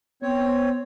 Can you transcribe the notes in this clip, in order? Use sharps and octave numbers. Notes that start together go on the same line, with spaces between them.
B3 C4 C#5